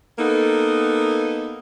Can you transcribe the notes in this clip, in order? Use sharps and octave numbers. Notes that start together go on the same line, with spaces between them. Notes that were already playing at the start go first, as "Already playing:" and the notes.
A#3 B3 D#4 A4